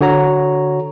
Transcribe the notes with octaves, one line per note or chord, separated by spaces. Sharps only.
D3 F#4 C#5 A#5